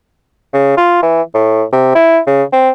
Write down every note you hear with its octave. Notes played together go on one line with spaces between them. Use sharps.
C#3
F4
E3
A2
C3
E4
C#3
C4